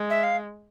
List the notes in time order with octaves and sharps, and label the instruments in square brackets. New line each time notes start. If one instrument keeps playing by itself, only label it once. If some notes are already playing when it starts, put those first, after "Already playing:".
Already playing: [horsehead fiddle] G#3
[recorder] E5
F5